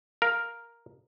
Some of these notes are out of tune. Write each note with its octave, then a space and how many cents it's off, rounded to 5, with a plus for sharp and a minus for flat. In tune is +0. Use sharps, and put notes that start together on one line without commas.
A#4 +0 F5 +0